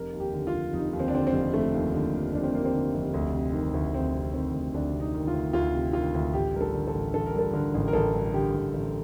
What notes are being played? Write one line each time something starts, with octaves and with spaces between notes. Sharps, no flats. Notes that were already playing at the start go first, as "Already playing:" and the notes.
Already playing: F1 A#4
D#2
G4
D3
F4
F1
F1 D#4
D#2
C4
D4
D3 C4
C4
F1
F1 A3
D#2
D3 A#3
F1
F1 D4
C4
D#2 A#3
C4
D3
F1
D2
C3
D#3
D2
D2 C4
C3
D#3 C4
D2
D2 D4
C3
D#4
D#3
F4
D2
D2 F4
C3
D#3 F4
D2
A1 G4
G2 A#4
A4
D3
A4
A1
A1 A4
A#4
G2 A4
D3 A#4
A1
A#4
A1 A4
G2
D3 G4
A1
A1